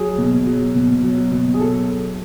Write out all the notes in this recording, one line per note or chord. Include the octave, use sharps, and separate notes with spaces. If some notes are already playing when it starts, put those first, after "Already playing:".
Already playing: F#3 G#4
B2
F#3
B2
F#3
B2
G#4
F#3 A4